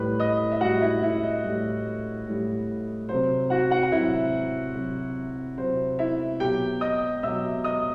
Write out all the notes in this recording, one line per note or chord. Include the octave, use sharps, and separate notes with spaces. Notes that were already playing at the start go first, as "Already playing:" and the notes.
Already playing: A2 G3 B4 B5
D#5 D#6
E5
A2 G3 F#4 F#5
E4 E5
E4 E5
D#5
A2 G3
A2 G3
C3 F#3 C5
F#4 F#5
F#4 F#5
F#5
C3 F#3 E4 E5
C3 F#3
C3 F#3 C5
E4 E5
B2 F#3 G4 G5
D#5 D#6
B2 F#3 E5 E6
D#5 D#6